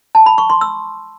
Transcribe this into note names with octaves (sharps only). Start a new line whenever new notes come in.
A5
B5
C#6
C6
E6